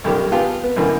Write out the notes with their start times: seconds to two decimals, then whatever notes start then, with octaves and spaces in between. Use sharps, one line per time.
0.04 B1 F#2 D#3 G3 G4
0.32 B3 F4 G4 G#4 G5 A5
0.63 B3
0.76 F#2 B2 D3 E3 A#3